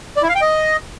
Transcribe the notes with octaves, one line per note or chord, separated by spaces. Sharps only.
D5
E4
F5
G5
D#5